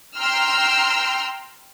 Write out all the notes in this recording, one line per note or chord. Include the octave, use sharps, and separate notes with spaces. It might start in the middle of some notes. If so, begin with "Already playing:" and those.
G5 A#5 C6 E6 F6